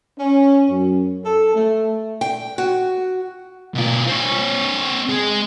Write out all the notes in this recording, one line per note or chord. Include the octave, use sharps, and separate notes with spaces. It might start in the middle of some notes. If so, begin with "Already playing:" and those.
C#4
F#2
A4
A3
G5
F#4
B2 F4
C4 C#5
G#3